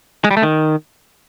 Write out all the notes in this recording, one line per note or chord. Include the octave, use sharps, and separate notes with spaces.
G#3
G3
A3
D#3